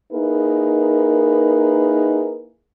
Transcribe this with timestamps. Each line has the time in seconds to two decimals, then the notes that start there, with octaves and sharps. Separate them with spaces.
0.12 A#3 D#4 E4 G#4 A#4 B4